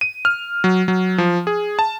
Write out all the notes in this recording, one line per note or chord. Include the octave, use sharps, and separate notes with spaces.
D#7
F6
F#3
F#3
F3
G#4
A5